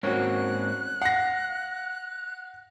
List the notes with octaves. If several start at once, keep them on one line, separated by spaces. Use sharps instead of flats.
G#2 A#3 C4 C#4 F#4 F#6
F5 F#5 A#6